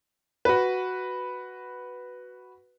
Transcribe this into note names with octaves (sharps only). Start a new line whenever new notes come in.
F#4 B4